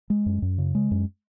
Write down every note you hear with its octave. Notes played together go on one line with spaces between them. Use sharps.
G#3
F#2
F#2
C#3
G#3
F#2